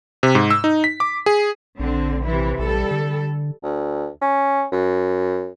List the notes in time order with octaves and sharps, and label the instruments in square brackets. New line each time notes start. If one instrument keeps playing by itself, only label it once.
[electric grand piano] C3
G#2
E6
D#4
B6
D6
G#4
[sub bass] A#1 [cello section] D3 C4
[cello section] C3 E3 E4
[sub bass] A#1 [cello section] G3 A4
[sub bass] D3
[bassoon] D2
C#4
F#2